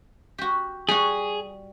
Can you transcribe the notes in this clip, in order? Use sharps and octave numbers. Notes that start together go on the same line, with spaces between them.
F#4 G4
G3 F#4 G#4